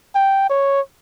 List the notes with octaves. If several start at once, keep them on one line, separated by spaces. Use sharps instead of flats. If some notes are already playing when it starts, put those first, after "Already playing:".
G5
C#5